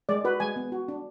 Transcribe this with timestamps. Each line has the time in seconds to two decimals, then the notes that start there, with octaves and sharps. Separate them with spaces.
0.09 G#3 D5
0.24 F#4 B4
0.40 G#3 G#5
0.56 B3
0.72 F#4
0.88 D4